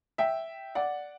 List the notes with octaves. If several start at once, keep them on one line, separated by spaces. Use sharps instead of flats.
E5 G5
D5 F#5